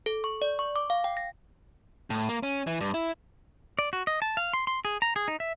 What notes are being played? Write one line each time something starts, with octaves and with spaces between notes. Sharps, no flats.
A4
C#6
D5
C#6
D6
F5
G5
A#6
A2
A#3
C#4
E3
G2
E4
D5
F#4
D#5
A5
F5
C6
C6
G#4
A#5
G#4
D#4
E5